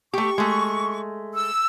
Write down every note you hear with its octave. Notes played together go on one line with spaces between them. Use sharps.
A3 G4 C#6
G#3 A3
E6